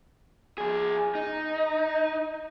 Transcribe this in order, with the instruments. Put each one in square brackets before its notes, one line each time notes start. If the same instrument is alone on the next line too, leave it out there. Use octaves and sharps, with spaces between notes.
[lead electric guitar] F3 G#4
D#4